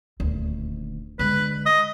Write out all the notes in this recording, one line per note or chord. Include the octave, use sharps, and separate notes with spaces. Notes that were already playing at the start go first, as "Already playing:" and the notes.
D#1 D2
D3 G#3 B4
D#5